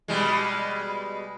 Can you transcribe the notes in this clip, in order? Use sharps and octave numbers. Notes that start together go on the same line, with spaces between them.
B2 G3 G#3